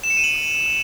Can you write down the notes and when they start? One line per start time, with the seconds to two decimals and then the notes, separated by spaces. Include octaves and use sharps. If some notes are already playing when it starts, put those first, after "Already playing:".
0.03 E7
0.10 C#7
0.17 D#7
0.24 F#7